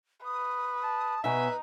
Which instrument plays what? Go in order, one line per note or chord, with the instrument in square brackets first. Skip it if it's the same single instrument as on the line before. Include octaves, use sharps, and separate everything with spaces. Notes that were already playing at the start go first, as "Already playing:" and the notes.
[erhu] B4 [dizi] D#6
[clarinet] A5
[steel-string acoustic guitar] B2 C#5 G#5 [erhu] D#4 [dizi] B4 [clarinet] E5